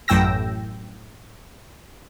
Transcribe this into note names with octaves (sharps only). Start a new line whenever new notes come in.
A1 F#2 A2 G5 E6 A#6